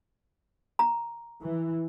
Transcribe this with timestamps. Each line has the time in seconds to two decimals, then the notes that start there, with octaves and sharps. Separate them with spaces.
0.79 A#5
1.42 E3